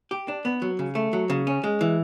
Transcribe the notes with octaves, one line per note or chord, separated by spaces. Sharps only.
G4
D4
B3
F#3
C#3
A3
F#3
C#3
C#4
G#3
E3